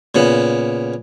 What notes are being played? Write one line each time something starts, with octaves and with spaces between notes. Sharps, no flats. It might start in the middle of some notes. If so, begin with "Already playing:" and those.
A#2 C#3 B3